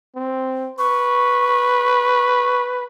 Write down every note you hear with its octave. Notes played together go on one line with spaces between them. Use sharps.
C4
B4 C#6